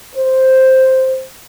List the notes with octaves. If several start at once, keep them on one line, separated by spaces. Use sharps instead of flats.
C5